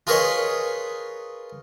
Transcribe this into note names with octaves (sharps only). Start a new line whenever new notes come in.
F4 G#4 A#4 B4 C#5 D#5